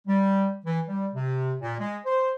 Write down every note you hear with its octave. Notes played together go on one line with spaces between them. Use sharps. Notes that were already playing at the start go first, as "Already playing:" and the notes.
G3
E3
G3
C3
A#2
G#3
C5